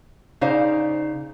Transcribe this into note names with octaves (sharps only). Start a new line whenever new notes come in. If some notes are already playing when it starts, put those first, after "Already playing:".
C#3 D#4 C5 D5 F5